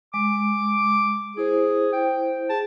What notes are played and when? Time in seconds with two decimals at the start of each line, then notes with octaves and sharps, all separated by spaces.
0.14 G#3 D6
1.37 E4 G#4 C5
1.93 G5
2.50 G#4 A5